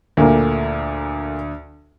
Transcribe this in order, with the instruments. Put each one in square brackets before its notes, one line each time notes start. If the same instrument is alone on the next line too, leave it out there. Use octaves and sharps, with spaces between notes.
[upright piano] D2 [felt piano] A#2 A3 A#3